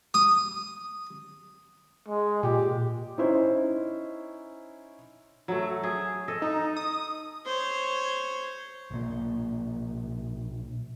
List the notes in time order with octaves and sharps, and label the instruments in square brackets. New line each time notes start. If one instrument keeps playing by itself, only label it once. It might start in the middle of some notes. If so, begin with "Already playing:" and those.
[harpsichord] D#6
[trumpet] G#3
[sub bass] A#2 [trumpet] G4
[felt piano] C#4 D#4 E4 C5
[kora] F#3 A3
G#4
A4 D#5
[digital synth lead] D#4
D#6
[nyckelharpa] C5 C#5
[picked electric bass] B1 A#2 A#3